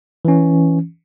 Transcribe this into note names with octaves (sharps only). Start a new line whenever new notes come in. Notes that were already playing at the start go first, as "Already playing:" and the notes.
E3 C#4